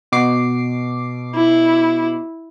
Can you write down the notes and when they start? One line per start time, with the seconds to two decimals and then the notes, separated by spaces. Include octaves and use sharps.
0.12 B2 D6 C7
1.35 E4